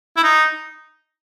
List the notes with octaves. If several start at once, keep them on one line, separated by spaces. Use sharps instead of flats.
E4
D#4